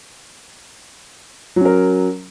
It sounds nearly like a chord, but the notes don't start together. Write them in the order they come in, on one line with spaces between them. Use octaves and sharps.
F#3 C#4 A#4